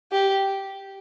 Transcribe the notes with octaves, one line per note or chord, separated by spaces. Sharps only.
G4